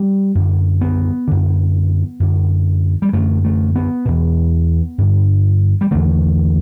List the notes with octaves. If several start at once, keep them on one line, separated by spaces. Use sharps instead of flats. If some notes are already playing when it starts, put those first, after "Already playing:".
Already playing: G3
F#2 D3
B3
F#2 D3
F#2 D3
G3
F#2 D3 A3
A3
B3
E2 B2
G2 D3
G3
E2 D3 A3